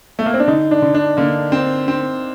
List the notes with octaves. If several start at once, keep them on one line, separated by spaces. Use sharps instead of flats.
A3
A#3
C4
D4
D3 D#4
D4
D3
D4
D3 A#3
C4
C4